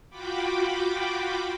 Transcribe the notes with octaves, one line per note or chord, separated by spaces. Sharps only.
F4 F#4 G5 B5 D6